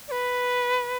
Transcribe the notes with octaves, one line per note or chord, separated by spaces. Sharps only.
D5
B4